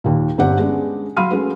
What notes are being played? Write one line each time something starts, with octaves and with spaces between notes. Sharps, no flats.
D#2 A#2
G1 C4 D4 G4 F#5
G#3 B3 C#4 D4
F#3 F5 B5 C6 F6 D#7
G#3 A3 C#4 F#4 B4